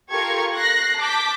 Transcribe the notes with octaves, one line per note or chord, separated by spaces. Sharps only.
F4 G4 A4 A#4 C#6 G#6
F#6 A#6 C7
A5 D6 G6 B6